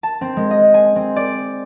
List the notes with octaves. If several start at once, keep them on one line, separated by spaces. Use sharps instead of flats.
A5
C4
G#3
D#5
G#5
C4
D5